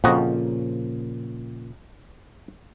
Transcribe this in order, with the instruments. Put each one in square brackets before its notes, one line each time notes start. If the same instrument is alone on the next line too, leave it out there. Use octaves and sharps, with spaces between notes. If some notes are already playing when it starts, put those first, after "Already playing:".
[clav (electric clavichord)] F2 F#4 D#5 [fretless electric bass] A#2 C#3 F3